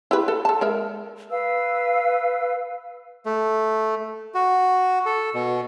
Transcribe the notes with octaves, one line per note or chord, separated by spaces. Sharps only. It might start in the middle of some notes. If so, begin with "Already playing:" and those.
E4 G4 B4
A4
A4 A5
G#3 A#4 E5
B4 F5 E6
A3
F#4
A4
B2